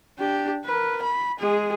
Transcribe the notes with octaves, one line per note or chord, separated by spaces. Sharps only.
D4 G4
A#4 B4
B5
G#3 G#4